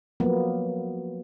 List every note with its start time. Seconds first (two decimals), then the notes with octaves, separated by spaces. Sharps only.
0.20 F3 F#3 A#3 B3